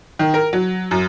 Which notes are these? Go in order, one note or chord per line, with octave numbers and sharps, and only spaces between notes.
D#3
A#4
F#3
F#2